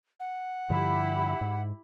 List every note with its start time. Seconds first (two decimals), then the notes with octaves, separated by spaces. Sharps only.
0.20 F#5
0.70 G2 D3 F3 E4 G4 B5
1.41 G#2